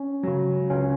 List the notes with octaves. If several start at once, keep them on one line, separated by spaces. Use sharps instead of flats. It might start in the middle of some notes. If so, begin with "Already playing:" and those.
Already playing: C#4
C#3 F#3
C#2 C#4